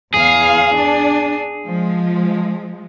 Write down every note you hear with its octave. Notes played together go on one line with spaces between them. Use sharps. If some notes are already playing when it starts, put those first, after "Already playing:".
E2 G#4 F5
D4
F3 G#3